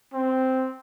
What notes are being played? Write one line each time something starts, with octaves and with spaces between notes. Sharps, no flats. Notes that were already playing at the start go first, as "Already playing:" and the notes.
C4